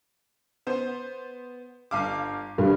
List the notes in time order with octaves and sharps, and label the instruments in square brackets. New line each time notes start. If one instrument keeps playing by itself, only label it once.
[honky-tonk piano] B3 C5
G1 F5 D6
[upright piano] G2 [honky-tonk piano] D3